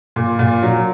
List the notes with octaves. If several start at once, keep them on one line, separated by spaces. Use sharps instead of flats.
A#2
A#2 F4
F#3